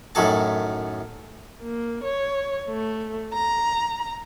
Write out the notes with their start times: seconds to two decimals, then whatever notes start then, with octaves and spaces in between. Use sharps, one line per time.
0.15 F#2 A2 D#3 F#3 A4 A5
1.62 A#3
2.04 C#5
2.68 A3
3.33 A#5